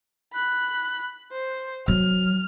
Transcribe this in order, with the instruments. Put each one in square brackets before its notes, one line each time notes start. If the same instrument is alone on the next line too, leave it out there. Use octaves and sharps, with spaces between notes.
[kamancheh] B5 F#6
C5
[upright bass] F#3 [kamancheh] F6